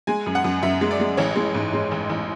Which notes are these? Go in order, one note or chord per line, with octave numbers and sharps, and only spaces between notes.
G#3 G#5
F#2
F#5
F#2
F#2 E5
G#3
D5
G#3
A1 C#5
G#3
G#2
G#3
A1
A1